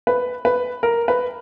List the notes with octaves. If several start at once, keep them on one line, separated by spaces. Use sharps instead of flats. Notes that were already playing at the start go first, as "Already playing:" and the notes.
B4
B4
A#4
B4